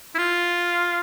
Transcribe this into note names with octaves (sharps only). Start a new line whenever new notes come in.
E4
F4